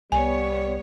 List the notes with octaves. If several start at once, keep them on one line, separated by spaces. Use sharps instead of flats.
C2 G3 B3 C#5 G#5